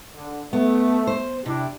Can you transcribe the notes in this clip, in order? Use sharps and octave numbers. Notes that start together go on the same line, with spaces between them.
D3
A3 B3
C5
C3 D4 E4 G4